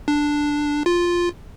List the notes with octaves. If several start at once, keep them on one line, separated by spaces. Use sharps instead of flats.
D4
F4